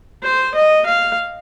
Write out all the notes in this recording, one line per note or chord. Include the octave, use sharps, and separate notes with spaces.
C5
D#5
F5